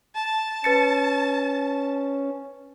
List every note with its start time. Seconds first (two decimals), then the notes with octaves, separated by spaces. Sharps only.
0.15 A5
0.64 C#4 B4 A6 C#7